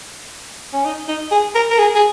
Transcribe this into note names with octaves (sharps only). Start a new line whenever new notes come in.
C#4
D#4
D#4
G#4
A#4
A#4
G#4
G#4